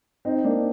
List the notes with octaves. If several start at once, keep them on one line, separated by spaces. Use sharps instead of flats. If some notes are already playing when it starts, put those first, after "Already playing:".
C4 D#4
A#3 D4